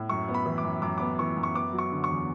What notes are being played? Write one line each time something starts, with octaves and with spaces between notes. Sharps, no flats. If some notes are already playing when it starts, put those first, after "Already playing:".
Already playing: A2
F#2 C#6
B3
B5
E3
D6
F#2
F#2 D6
B3 D6
E3 C#6
F#2
C#6
B3 D6
F#3
C#6
D3
C#6
E2